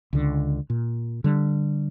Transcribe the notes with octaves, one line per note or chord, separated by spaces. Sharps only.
C#2 D3
A#2
D3 G3